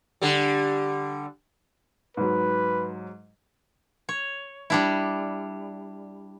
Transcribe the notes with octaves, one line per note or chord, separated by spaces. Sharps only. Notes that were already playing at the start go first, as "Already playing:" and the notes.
D3 G3
G#2 F#3 B4
C#5
G3 D4 E4